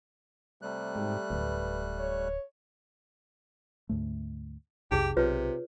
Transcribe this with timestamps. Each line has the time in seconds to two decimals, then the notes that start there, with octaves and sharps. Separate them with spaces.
0.62 C3 G3 A3 F#6
0.96 G#2
1.30 D1 B4
1.99 C#5
3.89 D2 G#2 A3
4.91 B1 F2 C3 D#4 G4 G#4
5.17 B1 C3 F4 B4 C#5